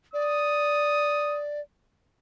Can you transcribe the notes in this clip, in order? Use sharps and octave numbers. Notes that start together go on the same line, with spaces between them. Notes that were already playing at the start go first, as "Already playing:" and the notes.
D5 D#6